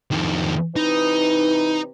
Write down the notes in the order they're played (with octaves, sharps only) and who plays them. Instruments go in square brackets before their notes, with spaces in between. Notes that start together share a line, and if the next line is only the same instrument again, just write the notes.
[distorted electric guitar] F2 D#3
[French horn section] C3 E3 B4 [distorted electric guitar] D#4